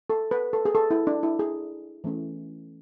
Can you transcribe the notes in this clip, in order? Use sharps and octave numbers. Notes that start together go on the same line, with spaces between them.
A4
B4
A4
G#4
A4
E4
D4
E4
G#4
E3 A3 C#4